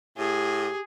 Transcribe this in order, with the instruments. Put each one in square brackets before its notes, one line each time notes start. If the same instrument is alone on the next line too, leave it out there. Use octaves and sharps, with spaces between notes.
[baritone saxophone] A2 [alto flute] G4 [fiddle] G#4